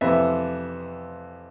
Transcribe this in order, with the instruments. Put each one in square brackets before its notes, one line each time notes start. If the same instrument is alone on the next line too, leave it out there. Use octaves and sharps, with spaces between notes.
[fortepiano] F2 C3 E3 B3 E5